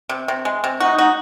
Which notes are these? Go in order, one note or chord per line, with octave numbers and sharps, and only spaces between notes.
C3
C3
G#3
C3
D#4 F#4
F#4